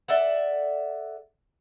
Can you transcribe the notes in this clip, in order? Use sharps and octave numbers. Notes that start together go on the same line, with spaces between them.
A4 D5 E5 F#5